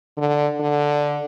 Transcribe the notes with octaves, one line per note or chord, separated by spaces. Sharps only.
D3
D3